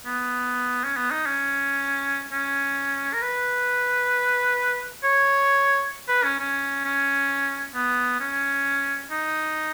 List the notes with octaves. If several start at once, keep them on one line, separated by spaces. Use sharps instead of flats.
B3
C#4
B3
D#4
C#4
C#4
A#4
B4
C#5
B4
C#4
C#4
C#4
B3
C#4
D#4